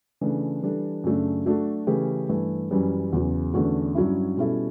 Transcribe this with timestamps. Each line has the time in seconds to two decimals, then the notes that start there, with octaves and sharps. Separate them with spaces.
0.21 C#3 E3 A3 D4
0.62 E3 G3 D4 A4
1.04 F#2 C#3 F#3 A3 D4
1.46 F#3 A3 D4 F#4 A4
1.87 C#3 E3 A3 C#4 G4
2.29 G2 E3 A3
2.71 F#2 E3 G3 C#4
3.13 E2 C#3 F#3
3.53 E2 D3 A3 C#4 F#4
3.95 G2 F#3 C#4 E4
4.37 B2 G3 C#4 E4 A4